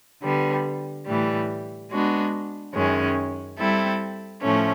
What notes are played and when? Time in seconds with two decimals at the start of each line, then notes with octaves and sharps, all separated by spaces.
0.22 D3 G3 B3
1.06 A2 E3 G3
1.91 G#3 B3 D4 F#4
2.75 F#2 D#3 G#3 C#4
3.58 G3 C4 E4 A4
4.43 A2 F3 A3 C#4